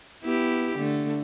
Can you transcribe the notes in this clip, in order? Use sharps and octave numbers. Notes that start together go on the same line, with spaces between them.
B3 E4 G4
D3 A3